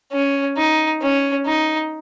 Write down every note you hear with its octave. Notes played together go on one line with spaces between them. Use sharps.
C#4
D#4
C#4
D#4